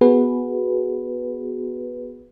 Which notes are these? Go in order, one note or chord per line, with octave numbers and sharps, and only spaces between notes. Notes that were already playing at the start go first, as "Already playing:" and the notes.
B3 F#4 G#4 B4